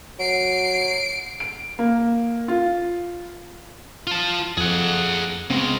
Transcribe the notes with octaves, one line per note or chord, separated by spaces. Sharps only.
F#3 C7 D7
D7
A#3
F4
F4 A5
F2 G#4 F#5
C#3 G#3 B3 C4